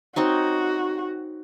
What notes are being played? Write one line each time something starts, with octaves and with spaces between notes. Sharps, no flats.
C4 D#4 F#4 C#5